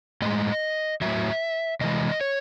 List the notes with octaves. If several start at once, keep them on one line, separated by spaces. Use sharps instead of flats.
A2 G#3 D#5
A2 F#3 E5
C3 E3 G#3 D#5
C#5